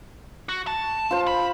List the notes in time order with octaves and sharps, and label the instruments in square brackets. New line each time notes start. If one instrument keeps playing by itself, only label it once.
[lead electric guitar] F#4
A5
[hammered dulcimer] F4 C5
[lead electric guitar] B5